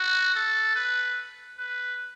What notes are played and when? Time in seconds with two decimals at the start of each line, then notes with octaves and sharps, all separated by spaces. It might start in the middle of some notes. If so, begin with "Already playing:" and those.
Already playing: F#4
0.35 A4
0.76 B4
1.59 B4